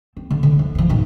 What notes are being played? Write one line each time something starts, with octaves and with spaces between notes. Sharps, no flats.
C4
D3
D3
F3
E3 F3
G#2 B2